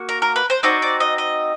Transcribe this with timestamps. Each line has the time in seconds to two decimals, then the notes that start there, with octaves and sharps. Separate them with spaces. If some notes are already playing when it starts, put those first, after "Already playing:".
Already playing: A#3 F#4
0.09 A#4
0.22 A#4
0.36 B4
0.50 C5
0.63 C4 D#4 F#4 D5
0.82 D5
1.00 D#5
1.18 D#5